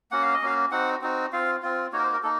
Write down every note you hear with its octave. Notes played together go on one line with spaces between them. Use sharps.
A#3 C#4 F#4 F#5
F5
D#5
A#3 C#4 F#4 F5
C4 D#4 F#4 F#5
C4 D#4 F#4
C4 F4 F5
C4 F4
A#3 D#4 F#4 C#5
A#4
C5
A#4
A#3 D#4 A4